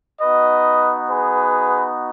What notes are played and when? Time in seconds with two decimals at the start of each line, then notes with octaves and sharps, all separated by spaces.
0.21 B3 D#4 F#4 B4 D#5
1.10 G#4 B4